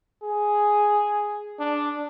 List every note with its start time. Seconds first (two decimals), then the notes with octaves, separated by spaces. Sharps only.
0.23 G#4
1.59 D4